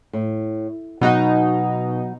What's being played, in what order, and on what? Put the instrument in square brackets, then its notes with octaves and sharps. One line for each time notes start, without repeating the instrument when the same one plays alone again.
[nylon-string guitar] A2
[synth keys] B2 D#4 [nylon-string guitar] F#3 F#5